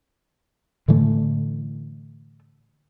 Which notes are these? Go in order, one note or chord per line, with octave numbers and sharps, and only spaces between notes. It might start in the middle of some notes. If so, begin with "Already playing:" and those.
A2 D3 E3 A3